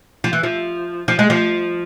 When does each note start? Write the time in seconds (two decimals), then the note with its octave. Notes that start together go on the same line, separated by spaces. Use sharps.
0.24 F3
0.33 E3
0.43 F3
1.08 F3
1.19 G#3
1.30 F3